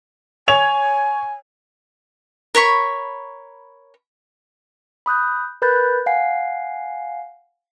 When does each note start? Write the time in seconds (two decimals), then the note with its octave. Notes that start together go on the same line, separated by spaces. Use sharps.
0.48 C#5 G#5 G#6 F7
2.55 A#4 C#5 B5 C#6
5.06 B5 D#6 F#6 G6
5.62 A#4 B4 B5 F#6 G6 A6
6.06 F5 F#5 G#5 C7